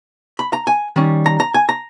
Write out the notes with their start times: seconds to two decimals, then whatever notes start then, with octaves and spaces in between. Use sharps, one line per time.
0.39 B5
0.53 A#5
0.67 G#5
0.96 D#3 G3 C#4
1.26 A#5
1.40 A#5
1.54 G#5
1.69 A#5